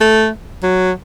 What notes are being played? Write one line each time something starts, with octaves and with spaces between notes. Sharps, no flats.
A3
F#3